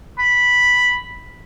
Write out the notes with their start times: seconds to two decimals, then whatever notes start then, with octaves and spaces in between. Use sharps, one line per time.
0.19 B5